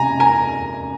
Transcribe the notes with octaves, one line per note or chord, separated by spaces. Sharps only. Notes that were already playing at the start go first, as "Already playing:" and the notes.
Already playing: C3 G#5 A#5
G#5 A#5